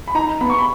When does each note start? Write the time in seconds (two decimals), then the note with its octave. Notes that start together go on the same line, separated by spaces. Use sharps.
0.08 B5
0.15 D#4 A#5
0.41 B3 B5
0.50 C#6
0.58 B5